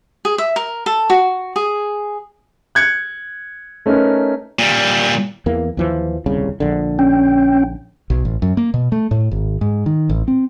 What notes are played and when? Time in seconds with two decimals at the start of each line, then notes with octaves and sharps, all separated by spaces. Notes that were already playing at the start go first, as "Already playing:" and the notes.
0.25 G#4
0.38 E5
0.56 A#4
0.86 A4
1.10 F#4
1.56 G#4
2.75 F#6 G#6 C#7
3.86 A3 C#4 D#4 A#4 B4
4.59 A#2 G3
5.46 E2 E3 A#3
5.77 D#2 E3 F3
6.26 D#1 C2 C#3
6.60 A#1 D3
6.99 C#4 G5
8.10 B1
8.25 A1
8.42 F#2
8.57 A#3
8.74 B2
8.92 A3
9.11 A2
9.32 G#1
9.61 G#2
9.86 D#3
10.09 A1
10.28 C4